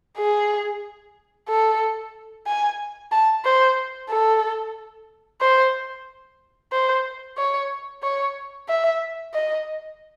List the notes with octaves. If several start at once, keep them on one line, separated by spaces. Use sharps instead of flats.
G#4
A4
G#5
A5
C5
A4
C5
C5
C#5
C#5
E5
D#5